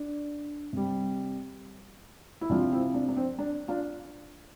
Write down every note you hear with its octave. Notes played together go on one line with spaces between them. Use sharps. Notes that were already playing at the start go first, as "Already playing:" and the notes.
Already playing: D4
C3 G3
E4
C3 F3 D4 F4
F4
C4 E4
D4
D4
C4
D4
D4 F4